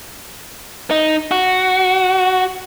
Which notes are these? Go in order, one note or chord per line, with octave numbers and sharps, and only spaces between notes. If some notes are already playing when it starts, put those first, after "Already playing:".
D#4
F#4